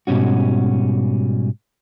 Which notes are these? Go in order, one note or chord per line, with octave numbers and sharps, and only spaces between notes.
G#2 B2 G3 C#4 F#4